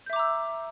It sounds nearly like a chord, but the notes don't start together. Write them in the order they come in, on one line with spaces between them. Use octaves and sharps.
G6 E5 D6 A#5 E6